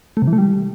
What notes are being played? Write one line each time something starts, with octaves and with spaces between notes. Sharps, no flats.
A3
C3
E3
A3
G3